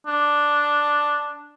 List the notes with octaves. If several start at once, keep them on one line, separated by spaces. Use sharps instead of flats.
D4